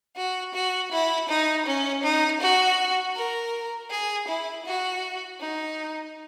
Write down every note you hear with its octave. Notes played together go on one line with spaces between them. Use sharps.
F#4
F#4
E4
D#4
C#4
D#4
F#4
A#4
G#4
E4
F#4
D#4